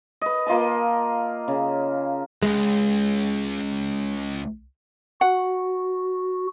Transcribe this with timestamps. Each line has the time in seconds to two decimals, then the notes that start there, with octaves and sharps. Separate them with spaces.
0.21 B4 D#5
0.47 A#3 F4 D#5 A5
1.48 C#3
2.43 C#2 G#3
5.21 F#4 F#5